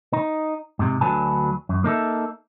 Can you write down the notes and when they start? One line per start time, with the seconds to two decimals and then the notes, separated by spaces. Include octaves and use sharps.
0.13 D#4
0.79 G#2 C3
1.01 D2 D3 F#3 B4 G#5 A5
1.69 F#2
1.84 A#3 D#4 A4 E5